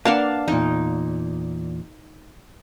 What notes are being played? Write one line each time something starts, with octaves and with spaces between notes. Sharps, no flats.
A#3 D4 B4 D5 F5 F#5 A5
E2 A#2 D#4